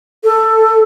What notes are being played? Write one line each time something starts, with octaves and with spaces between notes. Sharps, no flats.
A4